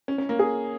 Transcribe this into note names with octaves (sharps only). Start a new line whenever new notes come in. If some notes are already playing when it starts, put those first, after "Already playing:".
C#4
C#4
A#3
G#4